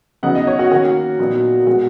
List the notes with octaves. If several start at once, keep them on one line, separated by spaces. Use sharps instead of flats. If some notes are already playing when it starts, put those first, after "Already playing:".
C#3 F#3 B3 D#4 F#5
D#5
C#5
F#4
D#3 A#3 C#4 F#4
A#2 F#3 B3 D#4
B2 G#3 B3 F#4